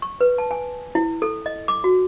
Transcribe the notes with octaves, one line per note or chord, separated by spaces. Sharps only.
C#6
B4
A5
G#5
E4
A4
D#5
D6
F#4